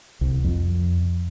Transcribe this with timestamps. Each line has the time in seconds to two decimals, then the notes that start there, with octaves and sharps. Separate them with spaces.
0.21 C2
0.44 F2